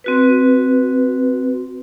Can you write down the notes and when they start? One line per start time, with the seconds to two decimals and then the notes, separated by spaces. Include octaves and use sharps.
0.04 C4 F#4 B4